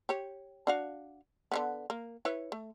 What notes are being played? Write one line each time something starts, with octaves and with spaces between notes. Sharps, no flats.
G4 C#5
D4 F#4 F5
D3 E3 B3
A#3
E4 B4 C#5
A3